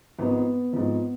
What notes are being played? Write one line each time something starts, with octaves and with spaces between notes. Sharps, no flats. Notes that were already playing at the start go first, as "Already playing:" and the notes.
G#1 G#2 F3 B3
G#1 G#2 F3